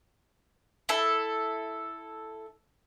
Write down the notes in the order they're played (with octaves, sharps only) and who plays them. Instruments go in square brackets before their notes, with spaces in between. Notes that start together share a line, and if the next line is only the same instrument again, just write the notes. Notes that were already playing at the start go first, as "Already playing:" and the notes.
[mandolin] E4 A4